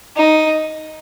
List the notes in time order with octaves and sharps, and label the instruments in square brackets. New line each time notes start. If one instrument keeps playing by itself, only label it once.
[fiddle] D#4